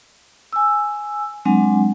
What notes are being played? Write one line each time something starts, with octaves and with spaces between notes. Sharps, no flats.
G#5 E6
F#3 G#3 C4 D4 F#5 G#5